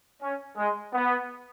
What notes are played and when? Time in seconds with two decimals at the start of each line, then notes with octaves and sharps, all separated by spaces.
0.20 C#4
0.56 G#3
0.93 B3